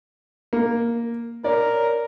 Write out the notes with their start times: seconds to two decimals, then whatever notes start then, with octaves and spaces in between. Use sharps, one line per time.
0.53 A#3
1.44 A#4 C#5 D5